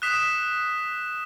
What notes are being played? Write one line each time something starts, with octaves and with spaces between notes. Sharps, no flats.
D#6 F#6 B6 E7